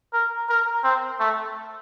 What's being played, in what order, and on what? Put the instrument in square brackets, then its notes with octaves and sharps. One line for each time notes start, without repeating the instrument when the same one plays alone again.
[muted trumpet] A#4
A#4
C4
A3